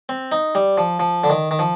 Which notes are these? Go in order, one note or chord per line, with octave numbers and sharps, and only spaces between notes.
C4
D#4
G3
F3
F3
D3
D#3
D#3
F3